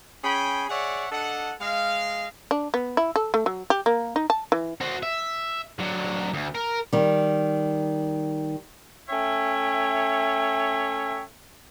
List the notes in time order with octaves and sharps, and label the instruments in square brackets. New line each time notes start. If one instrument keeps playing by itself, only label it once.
[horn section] C#4 G#4 G5 B5
G#4 C#5 D5 E5 F#5
D4 A4 D#5 F#5
G#3 D#5 F5
[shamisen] D4
B3
E4
A4
A3
F#3
G4
A#3
D#4
A5
E3
[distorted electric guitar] F#4 C5
E5
D3 F#3
D2
A#4
[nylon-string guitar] D#3 G3
[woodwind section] A3 C#4 C#5 E5 G5